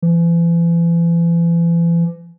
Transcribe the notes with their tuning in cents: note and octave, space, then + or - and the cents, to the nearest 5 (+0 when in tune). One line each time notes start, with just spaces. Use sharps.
E3 +40